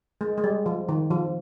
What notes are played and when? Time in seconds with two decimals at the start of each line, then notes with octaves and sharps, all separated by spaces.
0.21 G#3
0.38 G#3
0.44 G3
0.66 F3
0.89 D#3
1.11 F3